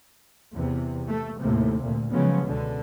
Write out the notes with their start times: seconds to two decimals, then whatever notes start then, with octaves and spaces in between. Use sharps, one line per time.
0.54 E2 C3
1.09 A3
1.40 D#2 A2 C3
1.81 D2 A#2
2.11 C#3 F3 F#3 G#3 B3 C#4
2.45 C#2 B2 D3